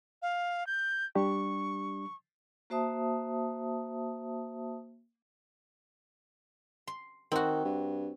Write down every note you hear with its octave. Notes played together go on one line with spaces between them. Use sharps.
F5
G6
G3 D4 G4 C#6
A#3 F#4 C5 E5 A5 D#6
C6
D#3 C4 F#4
G2